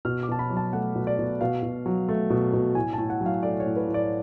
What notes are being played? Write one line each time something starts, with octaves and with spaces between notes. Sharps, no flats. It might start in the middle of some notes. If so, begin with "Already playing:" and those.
B2 F6
D6
B2 A5
B5
F#3
A5
A3 F#5
B2
D5
B2
B2 F5
B2
F#3
A3
B2
B2
A2 G#5
A2 A5
F#5
F#3
F5
A3 D5
C#5
A2
B4
A2
D5